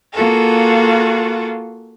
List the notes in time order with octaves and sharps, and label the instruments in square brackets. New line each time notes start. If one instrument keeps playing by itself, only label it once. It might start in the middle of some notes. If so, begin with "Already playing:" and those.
[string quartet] A#3 F4 F#4 G#4 A4